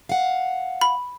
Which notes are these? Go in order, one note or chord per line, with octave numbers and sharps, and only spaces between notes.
F5 F#5
B5